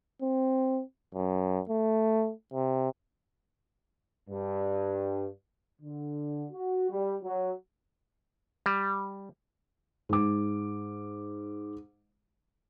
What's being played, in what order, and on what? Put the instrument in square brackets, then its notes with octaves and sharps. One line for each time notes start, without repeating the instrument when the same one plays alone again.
[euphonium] C4
F#2
A3
C3
[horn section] G2
[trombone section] D3
F#4
G3
F#3
[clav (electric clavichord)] G3
[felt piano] G#2 D6